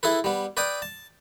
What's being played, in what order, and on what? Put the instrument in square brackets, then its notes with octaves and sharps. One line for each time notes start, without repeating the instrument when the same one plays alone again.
[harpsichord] E4 G#4 A4 B4
G3 B3
B4 D5 G5 D#6
A5